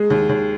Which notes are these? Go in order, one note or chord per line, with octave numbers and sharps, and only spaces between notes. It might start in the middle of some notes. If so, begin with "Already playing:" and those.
Already playing: G#3 G#4
D#2
D#2